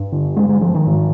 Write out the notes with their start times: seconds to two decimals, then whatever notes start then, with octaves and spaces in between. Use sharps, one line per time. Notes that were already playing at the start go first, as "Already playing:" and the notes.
Already playing: G2
0.12 D3
0.36 G#3
0.49 G#3
0.61 F3
0.74 D#3
0.87 G#2